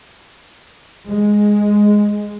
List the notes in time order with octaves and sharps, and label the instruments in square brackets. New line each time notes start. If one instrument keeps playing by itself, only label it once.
[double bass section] G#3